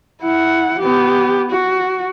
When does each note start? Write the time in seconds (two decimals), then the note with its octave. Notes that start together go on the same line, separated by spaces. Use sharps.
0.22 E4 F#5
0.79 B3 G4
1.51 F#4